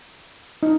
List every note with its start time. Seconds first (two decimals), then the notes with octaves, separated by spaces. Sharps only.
0.63 D#4